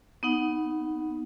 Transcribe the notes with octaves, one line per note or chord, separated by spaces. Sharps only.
B3 D#4 F#5